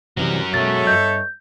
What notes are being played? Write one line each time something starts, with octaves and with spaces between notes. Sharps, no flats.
C3 E3 F#3 G3 A#4
B2 G#3 A4 C#5 E5 A6
G2 D#5 G6